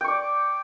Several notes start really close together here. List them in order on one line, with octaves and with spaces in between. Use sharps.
G5 C#6 D5